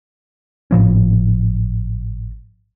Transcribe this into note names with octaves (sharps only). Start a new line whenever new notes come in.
G#1 A2 F3 C#4